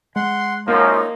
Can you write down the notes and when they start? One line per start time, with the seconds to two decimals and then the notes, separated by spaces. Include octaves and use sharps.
0.16 G#3 F#5 C6
0.68 F#2 F3 A#3 D#4